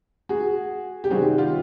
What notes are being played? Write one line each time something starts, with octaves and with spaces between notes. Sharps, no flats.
F#4 G#4
G4
C3 D#3 G3 C4 F#4 G#4
F4 G4